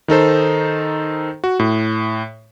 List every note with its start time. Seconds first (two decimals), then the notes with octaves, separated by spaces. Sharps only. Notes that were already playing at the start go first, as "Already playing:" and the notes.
0.08 D#3 D#4 A4 C5
1.44 F#4
1.59 A2